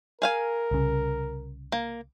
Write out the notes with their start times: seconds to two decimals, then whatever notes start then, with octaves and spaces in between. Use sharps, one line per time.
0.22 G#4 A#4 F5 G#5
0.71 C2 C#3
1.72 A#3